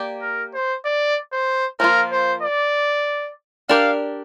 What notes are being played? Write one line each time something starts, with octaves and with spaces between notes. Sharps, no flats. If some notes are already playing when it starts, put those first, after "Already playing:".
Already playing: A#3 G4 D5
A#4
C5
D5
C5
F3 A#3 F4 A#4
C5
D5
D4 G4 A#4 D5 F5